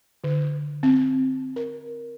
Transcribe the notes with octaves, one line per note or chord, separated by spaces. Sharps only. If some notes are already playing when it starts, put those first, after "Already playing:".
D3
C4
A#4